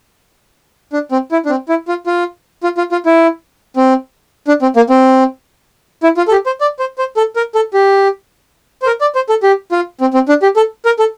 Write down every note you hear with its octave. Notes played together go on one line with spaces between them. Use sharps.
D4
C4
E4
D4
C4
E4
F4
F4
F4
F4
F4
E4
C4
D4
C4
A#3
C4
E4
F4
A4
G4
C5
D5
C5
C5
A4
A#4
A4
G4
C5
A#4
D5
C5
A4
G4
F4
C4
C4
D4
G4
A4
A#4
A4